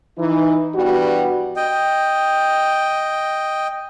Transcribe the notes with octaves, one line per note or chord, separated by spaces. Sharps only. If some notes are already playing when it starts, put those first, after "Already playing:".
E3 D#4
G2 E3 G3 B3 F#4
D#5 G5